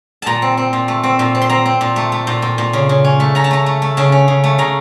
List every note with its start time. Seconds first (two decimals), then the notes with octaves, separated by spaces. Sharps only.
0.22 A#2 A5 A#5
0.42 C4
0.57 C4
0.73 A#2
0.88 A3
1.03 C4
1.19 A#2
1.35 C4
1.42 C6
1.49 C4 A#5
1.66 C4
1.81 A#2
1.96 A3
2.12 A3
2.27 A#2
2.42 A#2
2.58 A#2
2.73 C#3
2.89 C#3
3.04 C#4
3.20 A3
3.35 C#4 A#5
3.44 A5
3.51 A3 A#5
3.66 A3
3.82 A3
3.97 C#3 A5
4.12 C#4
4.28 C#3
4.44 A3
4.58 C#3 A#5